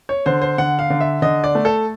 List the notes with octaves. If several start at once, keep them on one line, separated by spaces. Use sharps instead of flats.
C#5
D3 C5
C5
D3 F#5
F5
D3
E5
D3 D#5
D5
A3
A4